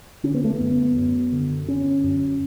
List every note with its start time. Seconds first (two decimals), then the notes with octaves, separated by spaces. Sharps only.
0.23 D3 C#4
0.34 B3
0.44 A3
0.54 B3
0.60 F#2
0.96 F#2
1.32 D3
1.68 D3 C#4
2.04 F#2